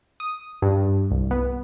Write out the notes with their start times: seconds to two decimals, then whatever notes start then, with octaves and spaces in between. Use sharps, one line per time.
0.20 D#6
0.62 G2
1.11 C2
1.31 B3